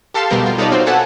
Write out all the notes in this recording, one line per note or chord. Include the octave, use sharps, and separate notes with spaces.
G4 A4 F5 A5 C6
B2 G3 B3 A#4 G6
F4
D#4 A4 B4 C#5 D5 F5
C4 F4 F#4 C5
A4 B4 F#5 G#5 A5